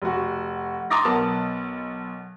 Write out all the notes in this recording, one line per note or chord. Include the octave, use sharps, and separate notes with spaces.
F1 F#4
A#5 C6 D6 D#6 A6 A#6
B1 B3 A#4 A5